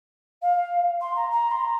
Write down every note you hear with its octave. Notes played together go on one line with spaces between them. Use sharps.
F5
C6
A#5
A#5
C6
A#5